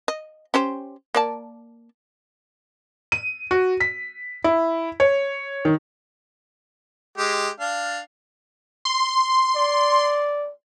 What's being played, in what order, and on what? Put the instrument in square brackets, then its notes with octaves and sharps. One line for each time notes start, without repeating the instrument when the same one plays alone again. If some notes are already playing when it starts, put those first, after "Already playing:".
[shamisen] D#5
C#4 G4 C5
A#3 D5 A5
[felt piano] D#7
F#4
B6
E4
C#5
D#3
[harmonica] G#3 G4
D4 F5
[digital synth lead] C6
[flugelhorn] D5